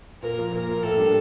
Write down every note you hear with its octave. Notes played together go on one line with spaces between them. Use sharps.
A#2 A#4
F3 A#3
A#2 A#4
F3 A#3
A2 A4
G3 D4